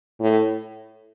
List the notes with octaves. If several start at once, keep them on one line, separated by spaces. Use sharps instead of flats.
A2